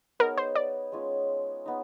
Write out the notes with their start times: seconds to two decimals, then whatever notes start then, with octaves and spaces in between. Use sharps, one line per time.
0.19 B3 D#4 G#4 A#4 C#5
0.37 C5
0.55 D5
0.92 G#3 C#4 F4
1.66 B3 D#4